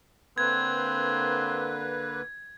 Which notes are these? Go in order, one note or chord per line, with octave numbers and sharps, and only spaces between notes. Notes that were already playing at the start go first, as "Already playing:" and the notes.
D3 A#3 C4 B4 G#6